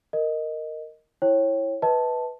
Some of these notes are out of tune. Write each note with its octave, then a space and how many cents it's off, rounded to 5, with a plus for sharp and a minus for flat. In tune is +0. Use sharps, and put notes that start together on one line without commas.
A#4 -10 D#5 +0
E4 +0 C#5 -20 G5 +0
B4 +0 D#5 +40 A5 +0